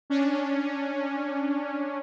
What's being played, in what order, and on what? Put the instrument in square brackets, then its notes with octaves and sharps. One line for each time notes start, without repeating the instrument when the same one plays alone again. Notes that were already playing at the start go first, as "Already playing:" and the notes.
[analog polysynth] C#4 D4